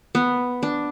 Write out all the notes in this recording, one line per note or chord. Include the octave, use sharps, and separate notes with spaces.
B3
D4